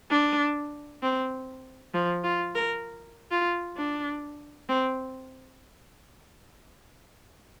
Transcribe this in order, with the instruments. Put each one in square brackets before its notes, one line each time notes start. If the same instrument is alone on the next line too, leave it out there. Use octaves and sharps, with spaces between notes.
[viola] D4
C4
F3
F4
A#4
F4
D4
C4